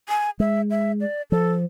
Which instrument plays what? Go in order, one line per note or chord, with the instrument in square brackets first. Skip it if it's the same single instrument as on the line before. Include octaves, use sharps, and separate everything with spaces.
[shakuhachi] G#5
[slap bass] G#3 [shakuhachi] E5
[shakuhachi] E5
D5
[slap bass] F3 [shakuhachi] A4